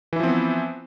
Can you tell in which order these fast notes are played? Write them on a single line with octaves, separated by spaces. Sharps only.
E3 E4 F3 C4 B3